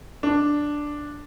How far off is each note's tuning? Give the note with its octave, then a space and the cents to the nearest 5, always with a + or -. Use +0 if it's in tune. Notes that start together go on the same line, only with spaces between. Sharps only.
D4 +0 D5 +0